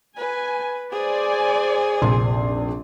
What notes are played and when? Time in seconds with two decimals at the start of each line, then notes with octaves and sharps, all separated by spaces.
0.17 B4 G#5
0.92 G#4 C5 D5 G#5
2.02 F1 A#1 C6